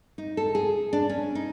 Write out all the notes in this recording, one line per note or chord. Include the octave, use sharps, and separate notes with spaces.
D#4
A4
G#4
D4
C#4
D#4